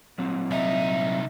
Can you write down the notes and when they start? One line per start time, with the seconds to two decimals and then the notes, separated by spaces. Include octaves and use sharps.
0.18 A#2 F#3 C4
0.51 C2 D#4 E5